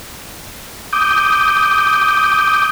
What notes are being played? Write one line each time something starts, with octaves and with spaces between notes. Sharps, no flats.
D6 D#6 G6